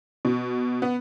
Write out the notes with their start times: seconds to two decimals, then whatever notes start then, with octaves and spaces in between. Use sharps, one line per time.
0.25 B2
0.82 B3